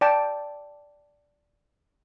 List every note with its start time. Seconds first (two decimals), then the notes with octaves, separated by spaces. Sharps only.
0.01 D5 G5 A5